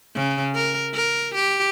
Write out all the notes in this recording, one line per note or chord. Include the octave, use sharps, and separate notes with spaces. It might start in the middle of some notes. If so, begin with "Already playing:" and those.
C#3
A#4
A#4
G4